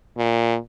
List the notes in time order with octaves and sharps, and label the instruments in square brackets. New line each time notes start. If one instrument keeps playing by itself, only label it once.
[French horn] A#2